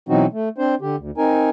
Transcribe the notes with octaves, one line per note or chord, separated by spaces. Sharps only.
B2 E3 F#3 C4 D#4 F#4
A3
C4 D4 C5
D3 G4
D2
C4 D#4 A#4 G#5